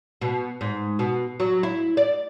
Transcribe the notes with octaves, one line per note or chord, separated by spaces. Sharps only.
B2
G#2
B2
F#3
E4
D5